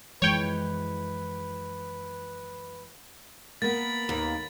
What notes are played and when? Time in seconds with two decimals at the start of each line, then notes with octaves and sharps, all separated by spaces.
0.22 F#2 E3 F3 G#3 B4 C#5 G5
3.62 A#3 B3 A#4 B5 A6
4.09 D#2